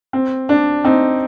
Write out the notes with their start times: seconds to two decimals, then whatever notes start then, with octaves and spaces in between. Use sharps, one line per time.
0.13 C4
0.49 D4
0.84 C4 D#4